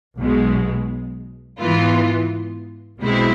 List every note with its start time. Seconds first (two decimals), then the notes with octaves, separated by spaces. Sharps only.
0.18 B1 B2 G#3
1.59 G#2 E3 B3 F4
3.01 B1 B2 G#3 C4 E4